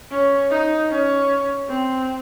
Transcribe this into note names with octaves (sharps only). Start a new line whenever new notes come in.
C#4
D#4
C#4
C4